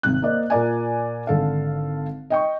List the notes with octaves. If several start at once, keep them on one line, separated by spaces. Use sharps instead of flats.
G#1 C3 F#6
A#3 C5 D5 D#5
A#2 A#4 D5 G#5
G#1 D3 A4 F5
D#5 G5 C#6